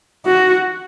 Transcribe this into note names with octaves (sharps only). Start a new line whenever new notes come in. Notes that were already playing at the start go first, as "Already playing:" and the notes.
F#4